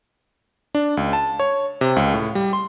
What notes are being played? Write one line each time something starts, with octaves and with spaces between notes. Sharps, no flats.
D4
C#2
A5
C#5
C3
C#2
A2
G3
C6